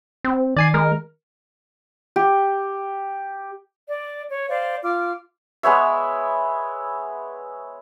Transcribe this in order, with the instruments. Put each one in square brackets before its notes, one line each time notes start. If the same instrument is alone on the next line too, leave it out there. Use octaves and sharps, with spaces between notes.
[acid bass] C4
[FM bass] D#3 [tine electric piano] D5 G#5 C7
[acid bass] G#3 [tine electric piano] A#4
[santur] G4
[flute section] D5
C#5
C5 D5 F5
F4 D6 F6
[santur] G#3 B3 C#5 E5